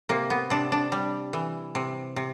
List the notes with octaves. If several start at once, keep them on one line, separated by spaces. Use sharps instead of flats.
C3 A#3
B3
C3 D4
D4
G3
E3
C3
C3